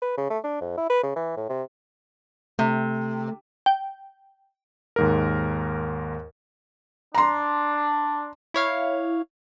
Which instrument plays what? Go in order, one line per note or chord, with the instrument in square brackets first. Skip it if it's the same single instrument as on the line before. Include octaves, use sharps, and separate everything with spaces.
[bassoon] B4
C#3
A3
D4
F2
E4
B4
C#3
E3
A2
C3
[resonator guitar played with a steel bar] C3 [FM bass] A3
[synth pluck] G5
[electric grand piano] D#2 G#2 A#4
[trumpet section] D4 [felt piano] A#5 C6
[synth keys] E4 C#5 F5